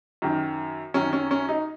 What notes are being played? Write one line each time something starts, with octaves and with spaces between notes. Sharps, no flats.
F#2 D#3
F#2 D#3 C#4
C#4
C#4
D#4